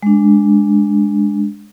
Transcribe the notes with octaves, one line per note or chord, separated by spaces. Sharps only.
G#3 D4